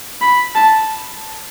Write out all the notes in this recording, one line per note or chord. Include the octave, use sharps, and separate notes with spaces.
B5
A5